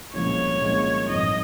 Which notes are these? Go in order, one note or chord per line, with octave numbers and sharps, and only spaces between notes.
C2 A#2 F3 G#3 C#4 C#5
C2 A#2 F3 G#3 C#4
G#1 G2 F3 D#5